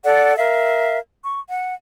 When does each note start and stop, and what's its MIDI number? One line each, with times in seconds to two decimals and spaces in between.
0.04 0.35 69
0.04 0.35 74
0.04 0.35 78
0.36 0.97 70
0.36 0.97 76
0.36 0.97 77
1.24 1.39 85
1.48 1.74 78